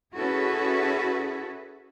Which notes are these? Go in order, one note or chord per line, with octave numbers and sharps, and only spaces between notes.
C#4 E4 F#4 G#4 A4 B4